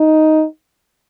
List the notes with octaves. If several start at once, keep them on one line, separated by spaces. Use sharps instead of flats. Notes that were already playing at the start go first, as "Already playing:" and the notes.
Already playing: D#4